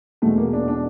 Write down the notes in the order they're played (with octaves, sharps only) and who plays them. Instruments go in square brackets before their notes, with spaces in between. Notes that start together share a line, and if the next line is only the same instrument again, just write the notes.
[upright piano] E2 B2 G#3 A3
A#3
D4
D4